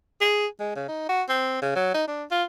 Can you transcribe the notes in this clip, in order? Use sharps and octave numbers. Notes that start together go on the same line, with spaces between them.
G#4
G#3
C#3
D#4
F#4
C4
C#3
F#3
D#4
D4
F4